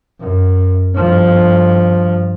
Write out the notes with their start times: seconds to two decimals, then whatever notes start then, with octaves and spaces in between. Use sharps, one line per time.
0.20 F#2
0.95 G2 F3